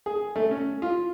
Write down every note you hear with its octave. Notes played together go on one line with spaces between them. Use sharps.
G#4
A3
C#4
F4